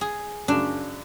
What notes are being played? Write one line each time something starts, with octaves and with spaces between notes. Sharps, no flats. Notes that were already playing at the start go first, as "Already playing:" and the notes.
G#4
F#2 C#3 D4